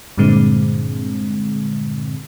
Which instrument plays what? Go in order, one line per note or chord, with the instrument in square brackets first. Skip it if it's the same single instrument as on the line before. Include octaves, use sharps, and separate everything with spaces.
[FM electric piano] G2 A#2 D3 G#3 C4